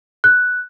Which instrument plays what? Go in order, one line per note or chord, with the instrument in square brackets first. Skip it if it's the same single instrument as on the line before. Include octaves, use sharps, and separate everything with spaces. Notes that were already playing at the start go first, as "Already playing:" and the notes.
[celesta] F#6